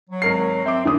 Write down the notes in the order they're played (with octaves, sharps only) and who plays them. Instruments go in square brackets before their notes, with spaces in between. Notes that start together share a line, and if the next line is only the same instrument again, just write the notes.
[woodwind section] F#3
[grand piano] G#1 A#4 C7
[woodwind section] C4 [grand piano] E5 D6
[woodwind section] D#2 D#3 G3 [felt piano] D4 D#6